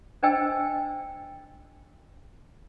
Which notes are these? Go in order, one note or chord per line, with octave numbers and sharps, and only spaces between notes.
D4 C5 D#5 G5 G#5 E6